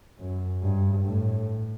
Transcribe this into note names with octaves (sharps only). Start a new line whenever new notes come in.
F#2
G2
A2